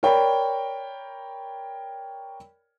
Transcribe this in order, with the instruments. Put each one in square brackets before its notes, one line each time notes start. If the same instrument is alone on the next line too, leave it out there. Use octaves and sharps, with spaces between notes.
[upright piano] A#4 C#5 D5 G5 B5